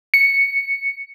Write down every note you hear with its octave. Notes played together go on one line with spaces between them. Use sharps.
C#7